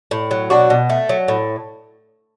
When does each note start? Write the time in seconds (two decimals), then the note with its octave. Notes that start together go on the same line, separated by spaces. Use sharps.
0.11 A2
0.31 F#3
0.50 B2 D4 F#4
0.70 B2
0.89 A3
1.09 F#3
1.28 A2